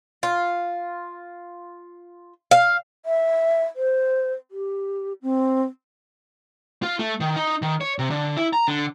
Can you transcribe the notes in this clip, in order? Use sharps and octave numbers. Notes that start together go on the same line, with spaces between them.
F4
F5
E5
C5
G4
C4
F4
A3
D#3
D#4
D#3
C#5
C3
D3
E4
A#5
D3